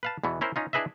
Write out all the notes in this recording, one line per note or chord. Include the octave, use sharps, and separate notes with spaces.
B4 F5 A5
E2 B2 E3 B3
C#4 E4 A#4 C5
C#4 D#4 F4
D4 E4 G#4 B4 D#5 E5